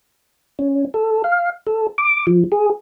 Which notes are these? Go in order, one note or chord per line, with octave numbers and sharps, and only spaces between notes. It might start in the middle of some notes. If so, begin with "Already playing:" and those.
C#4
A4
F5
A4
D6
F3
G#4